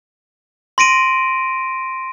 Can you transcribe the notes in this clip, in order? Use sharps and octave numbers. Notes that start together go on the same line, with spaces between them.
C6 A#6 D7 D#7